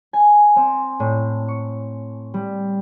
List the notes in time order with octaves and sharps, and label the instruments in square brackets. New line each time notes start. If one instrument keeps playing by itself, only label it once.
[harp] G#5
C4
A2
C#6
G3